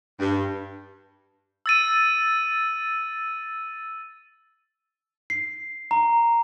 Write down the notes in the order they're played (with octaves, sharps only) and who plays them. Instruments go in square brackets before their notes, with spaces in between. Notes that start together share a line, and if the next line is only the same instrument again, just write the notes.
[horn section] G2
[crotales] E6 A6 D#7
[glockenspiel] C7
A#5